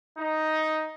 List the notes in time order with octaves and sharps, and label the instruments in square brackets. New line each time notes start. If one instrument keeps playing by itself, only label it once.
[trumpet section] D#4